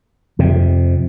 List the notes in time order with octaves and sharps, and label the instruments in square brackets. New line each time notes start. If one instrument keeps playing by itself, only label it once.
[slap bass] F2 C3